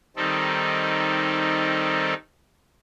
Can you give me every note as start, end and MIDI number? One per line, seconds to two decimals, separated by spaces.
0.16 2.14 51
0.16 2.14 55
0.16 2.14 60
0.16 2.14 63
0.16 2.14 69